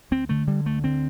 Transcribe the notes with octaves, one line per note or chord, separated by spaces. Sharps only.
D2 C4
D3 A3
D3 G3
D2 A3
D3 C4